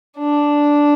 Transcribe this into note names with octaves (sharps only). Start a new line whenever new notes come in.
D4